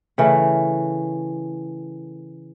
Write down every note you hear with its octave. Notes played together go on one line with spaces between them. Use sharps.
C#3 E3 A3